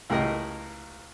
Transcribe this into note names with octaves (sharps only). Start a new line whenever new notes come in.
C#2 A2 G4 A#4 D#5